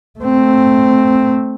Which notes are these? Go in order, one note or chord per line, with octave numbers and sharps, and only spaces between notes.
A3 C4